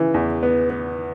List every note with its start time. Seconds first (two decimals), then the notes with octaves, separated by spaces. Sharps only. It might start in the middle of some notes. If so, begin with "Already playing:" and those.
Already playing: C#3 E3
0.14 E2
0.43 B3
0.70 B3